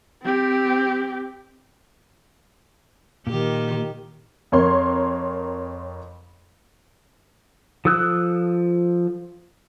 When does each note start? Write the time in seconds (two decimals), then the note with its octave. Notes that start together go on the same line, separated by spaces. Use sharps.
0.23 C4 G4
3.27 A#2 D#3 G4
4.52 F2 A#4 C#5 C6
7.85 F3 A4 D#6 E6 F#6